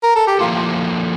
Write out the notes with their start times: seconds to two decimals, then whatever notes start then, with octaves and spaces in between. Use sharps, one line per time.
0.03 A#4
0.16 A4
0.27 G4
0.39 F3 A#3 E4 F4 A4